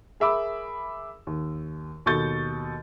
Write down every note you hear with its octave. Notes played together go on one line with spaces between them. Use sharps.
G#4 A#4 E5 B5 D6 E6
D#2
D#2 B2 A4 C#6 G6 A6